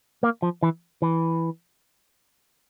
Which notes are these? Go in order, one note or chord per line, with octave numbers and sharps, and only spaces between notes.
A#3
F3
E3
E3